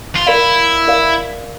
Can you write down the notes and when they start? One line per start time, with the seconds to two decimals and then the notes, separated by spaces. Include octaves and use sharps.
0.15 F4
0.27 E4 A#4 D5 F5
0.88 A#4 D5 F5